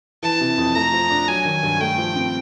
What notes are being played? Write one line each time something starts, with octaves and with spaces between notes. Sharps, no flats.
E3 A5
C3
F2
A3 A#5
F3
D4
F#3 G#5
D#3
G2
A3 G5
F3
C4